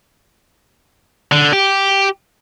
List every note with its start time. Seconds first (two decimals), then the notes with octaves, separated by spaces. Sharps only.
1.32 D3
1.53 G4